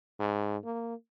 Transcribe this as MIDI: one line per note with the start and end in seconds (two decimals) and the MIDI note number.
0.19 0.57 44
0.64 0.94 58